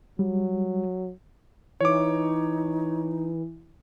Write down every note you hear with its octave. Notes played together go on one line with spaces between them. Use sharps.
F#3 G3
E3 D#4 C#5 D6